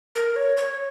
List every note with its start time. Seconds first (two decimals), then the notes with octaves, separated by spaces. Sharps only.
0.15 A#4
0.36 C#5
0.57 C#5